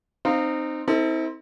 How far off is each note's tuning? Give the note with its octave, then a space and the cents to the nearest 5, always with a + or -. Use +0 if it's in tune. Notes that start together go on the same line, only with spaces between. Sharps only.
C4 +0 D#4 -20 F5 +0
C4 +0 E4 -45 A4 +35